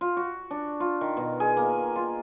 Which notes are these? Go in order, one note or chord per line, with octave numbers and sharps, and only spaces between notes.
F4
F#4
D4
F4
D#3
B2
G#4
A#3
F4